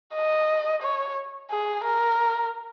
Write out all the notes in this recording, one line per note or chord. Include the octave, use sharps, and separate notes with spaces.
D#5
C#5
G#4
A#4